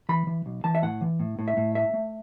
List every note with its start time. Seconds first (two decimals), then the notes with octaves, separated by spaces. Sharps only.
0.09 E3 B5
0.27 E3
0.46 B1
0.64 E3 A5
0.75 E5
0.82 A2 F#5
1.01 E3
1.20 A2
1.39 A2
1.48 E5
1.57 A2
1.75 A3 E5
1.94 A3